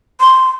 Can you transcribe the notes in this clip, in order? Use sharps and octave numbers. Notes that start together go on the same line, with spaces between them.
C6